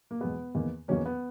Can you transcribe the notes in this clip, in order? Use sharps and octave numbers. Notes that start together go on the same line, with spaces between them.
A#3
E2 B2 G#3 B3
E2 D#3 A#3
E2 D#3 F#3 A#3 C#4
B3